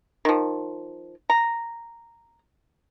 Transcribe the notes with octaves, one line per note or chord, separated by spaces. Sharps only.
D#3 F3
A#5